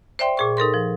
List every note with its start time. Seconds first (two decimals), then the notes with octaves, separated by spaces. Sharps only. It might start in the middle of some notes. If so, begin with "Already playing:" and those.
0.19 C5 D5 E5 G5 C6
0.37 A#2 G#4 C#6
0.57 D#4 A4 A#4 C6
0.74 F3